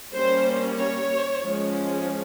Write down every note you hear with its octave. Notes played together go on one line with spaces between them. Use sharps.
G3 A#3 C#4 C5
C#5
F3 G#3 C#4